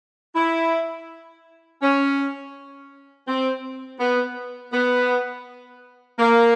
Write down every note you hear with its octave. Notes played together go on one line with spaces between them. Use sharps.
E4
C#4
C4
B3
B3
A#3